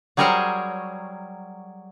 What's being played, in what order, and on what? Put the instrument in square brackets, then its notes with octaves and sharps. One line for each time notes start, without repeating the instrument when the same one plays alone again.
[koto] F#3 G3 G#4 A#4 C5 C#5